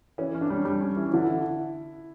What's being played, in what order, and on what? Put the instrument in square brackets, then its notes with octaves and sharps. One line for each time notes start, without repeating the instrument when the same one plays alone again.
[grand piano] E3 [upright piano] C#4
[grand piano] C#4
[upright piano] D4
[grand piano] G3
G3
C#4
E3
[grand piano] D3 [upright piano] E4